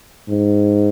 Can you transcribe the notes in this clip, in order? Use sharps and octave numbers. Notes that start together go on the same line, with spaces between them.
G#2